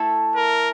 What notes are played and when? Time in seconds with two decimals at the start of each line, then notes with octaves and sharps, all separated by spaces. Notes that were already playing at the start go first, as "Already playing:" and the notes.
Already playing: A3 E4 A4
0.36 A#4